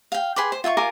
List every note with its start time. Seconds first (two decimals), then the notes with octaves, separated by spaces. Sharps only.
0.12 F5 G5
0.36 G#4 B4 C6 D6
0.52 C5
0.64 F4 E5 G5 C#6
0.77 F4 A#4 G#5 D6